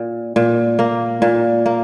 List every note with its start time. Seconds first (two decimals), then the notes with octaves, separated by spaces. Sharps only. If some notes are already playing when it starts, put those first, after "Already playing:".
Already playing: A#2
0.36 A#2
0.79 A#3
1.22 A#2
1.66 A#3